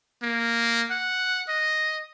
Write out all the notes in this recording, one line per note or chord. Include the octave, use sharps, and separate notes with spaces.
A#3
F#5
D#5